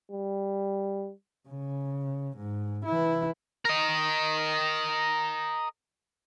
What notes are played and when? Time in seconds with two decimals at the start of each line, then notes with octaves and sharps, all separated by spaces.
0.11 G3
1.48 C#3
2.37 G#2
2.85 E3 E4
3.65 A#4 D#5